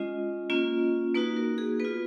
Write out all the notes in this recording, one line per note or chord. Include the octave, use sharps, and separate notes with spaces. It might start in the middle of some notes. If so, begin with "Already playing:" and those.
Already playing: G#3 C#4 F4 D#5
A#3 C#4 F4
A#3 D#4 F#4 B4
A#4
G#4
B3 F4 B4